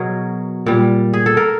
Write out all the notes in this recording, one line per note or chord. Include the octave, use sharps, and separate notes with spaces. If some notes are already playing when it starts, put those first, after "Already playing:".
Already playing: B2 F#3 G#4 A#4
A#2 G3
G#4
A4
A#4